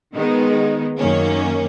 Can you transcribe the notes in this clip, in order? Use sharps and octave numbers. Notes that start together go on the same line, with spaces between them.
D#3 G#3 B3 D#4
F#2 D#3 A#3 C#4